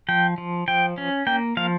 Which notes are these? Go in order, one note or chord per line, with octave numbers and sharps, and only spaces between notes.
F3 G5
F3
F3 G5
C#4
A#3 G5
F3 F5